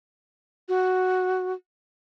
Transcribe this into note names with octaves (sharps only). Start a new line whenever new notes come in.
F#4